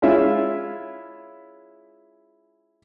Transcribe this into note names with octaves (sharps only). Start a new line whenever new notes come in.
G#3 C#4 E4 F4 E5